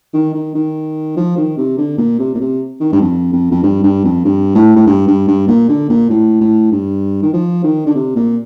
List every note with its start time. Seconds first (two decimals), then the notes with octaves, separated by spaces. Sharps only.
0.13 D#3
0.34 D#3
0.55 D#3
1.16 F3
1.37 D#3
1.57 C3
1.78 D3
1.98 A#2
2.19 C3
2.34 A#2
2.40 C3
2.80 D#3
2.92 G2
3.01 F2
3.32 F2
3.51 F2
3.63 G2
3.83 G2
4.04 F2
4.25 G2
4.55 A2
4.76 A2
4.86 G2
5.07 G2
5.28 G2
5.48 A#2
5.69 D3
5.89 A#2
6.10 A2
6.41 A2
6.71 G2
7.22 D#3
7.33 F3
7.64 D#3
7.86 D3
7.95 C3
8.15 A#2